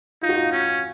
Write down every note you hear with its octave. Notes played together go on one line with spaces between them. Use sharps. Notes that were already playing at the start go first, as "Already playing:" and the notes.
D#4 F4
F#4
F4
C#4